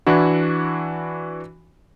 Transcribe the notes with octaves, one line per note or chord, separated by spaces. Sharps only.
E3 D4 E4 F#4